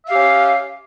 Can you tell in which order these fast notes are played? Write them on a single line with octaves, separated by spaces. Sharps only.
E5 F5 G4 C#4